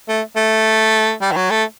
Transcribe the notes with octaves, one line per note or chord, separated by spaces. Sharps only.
A3
A3
G3
D#3
F#3
A3